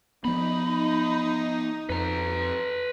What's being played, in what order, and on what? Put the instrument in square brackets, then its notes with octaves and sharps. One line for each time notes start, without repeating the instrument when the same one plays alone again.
[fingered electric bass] F3 B3 [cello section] D#4 [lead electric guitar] B5
[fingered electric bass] F2 [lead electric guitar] B4 A#5